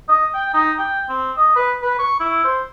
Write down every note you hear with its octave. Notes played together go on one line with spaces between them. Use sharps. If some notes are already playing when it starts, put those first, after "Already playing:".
D#5
G5
D#4
G5
C4
D#5
B4
B4
C#6
E4
C5